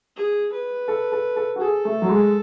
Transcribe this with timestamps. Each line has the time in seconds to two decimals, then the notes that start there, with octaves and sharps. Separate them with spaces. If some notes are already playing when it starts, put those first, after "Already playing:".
0.16 G#4
0.52 B4
0.88 A4
1.12 A4
1.36 A4
1.56 F#4
1.60 G#4 A4
1.85 A3
2.02 F#3
2.09 G#3